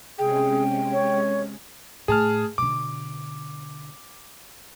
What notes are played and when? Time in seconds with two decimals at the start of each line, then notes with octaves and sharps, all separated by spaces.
0.18 C3 G#3 C#4 G#4 G5
0.92 C#5
2.08 A2 G#4 A5 F6
2.58 B2 D3 D6